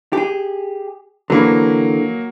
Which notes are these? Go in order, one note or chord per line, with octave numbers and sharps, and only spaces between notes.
G4 G#4
D3 E3 F#3 A#3